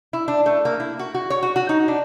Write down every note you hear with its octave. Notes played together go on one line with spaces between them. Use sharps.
E4
D4
A3
A#3
E4
F#4
F#4
C#5
F#4
F#4
D#4
D4